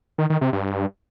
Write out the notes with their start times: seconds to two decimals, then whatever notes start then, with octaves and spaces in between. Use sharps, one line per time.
0.18 D#3
0.30 D#3
0.41 C3
0.53 G2